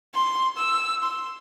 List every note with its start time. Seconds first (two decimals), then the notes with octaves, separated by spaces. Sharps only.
0.14 C6
0.57 E6
1.03 C6